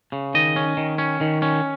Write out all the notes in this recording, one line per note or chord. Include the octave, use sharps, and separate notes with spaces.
C#3
D#3 D#5
C#4
D#3
C#4
D#3
C#4